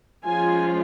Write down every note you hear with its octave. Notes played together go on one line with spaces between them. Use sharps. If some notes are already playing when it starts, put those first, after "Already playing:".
F3 G#3 C#4 F4 G#5